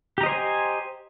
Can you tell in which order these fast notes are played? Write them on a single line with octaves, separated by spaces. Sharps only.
G4 A#5 D#5 C5 G#5